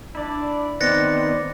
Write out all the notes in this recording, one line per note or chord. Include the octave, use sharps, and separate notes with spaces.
D4 E4 D5
D#3 B3 C4 D5 F#6 A6 A#6 C#7